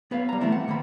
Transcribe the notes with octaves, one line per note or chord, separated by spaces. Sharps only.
B3 B4 C#5 F5
G3 A#5
E3 A3 B3 C4 E4
F#5
D#3 A#3 C4 B5